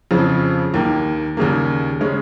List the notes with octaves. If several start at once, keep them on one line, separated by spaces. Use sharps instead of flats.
F2 C#3 F3
D#2 D#3 A#3
D#2 C#3 G3 A#3
C#3 G#3 C#4